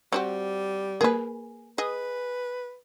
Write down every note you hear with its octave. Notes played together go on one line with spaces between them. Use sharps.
G3 C4 F#4 G4
A#3 G#4 A#4 B4
G#4 B4 D#5